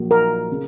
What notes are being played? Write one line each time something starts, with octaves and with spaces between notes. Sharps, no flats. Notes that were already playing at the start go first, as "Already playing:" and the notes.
Already playing: A#1 A#2 F#3 A#3
A#4
C#3